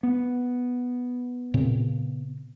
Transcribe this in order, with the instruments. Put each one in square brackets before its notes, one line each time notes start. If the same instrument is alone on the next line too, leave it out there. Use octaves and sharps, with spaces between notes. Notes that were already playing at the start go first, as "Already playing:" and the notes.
[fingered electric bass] B3
[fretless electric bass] A#2 C#3 C4